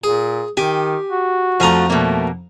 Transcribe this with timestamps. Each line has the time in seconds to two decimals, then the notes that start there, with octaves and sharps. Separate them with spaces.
0.04 A#2 G#4
0.57 D#3 G4 G#5
1.11 F#4
1.60 F2 F3 A3 G#5 A#5
1.90 B2 A3 A#3